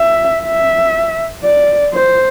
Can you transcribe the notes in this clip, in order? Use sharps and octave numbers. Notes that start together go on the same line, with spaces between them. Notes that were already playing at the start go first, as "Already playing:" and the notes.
Already playing: E5
E5
D5
C5